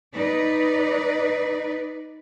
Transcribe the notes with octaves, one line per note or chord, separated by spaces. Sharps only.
D#4 B4 D5